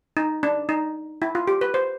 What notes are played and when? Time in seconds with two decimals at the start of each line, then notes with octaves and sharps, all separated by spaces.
0.17 D#4
0.43 D4
0.69 D#4
1.22 E4
1.35 F4
1.48 G4
1.61 B4
1.74 C5